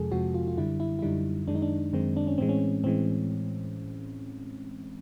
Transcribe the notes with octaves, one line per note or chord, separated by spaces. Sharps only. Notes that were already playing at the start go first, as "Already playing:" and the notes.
Already playing: F2 C3 F3 G#3 G#4 A4
F2 C3 F3 G#3 F#4
F4
F4
F#2 D3 G3 E4
E4
E4
F#2 D3 G3 D#4
F#2 D#3 G#3 D4
D#4
D4
F#2 D#3 G#3 C4
D4
C#4
A2 E3 G#3 C4
C#4
A2 E3 G#3 C4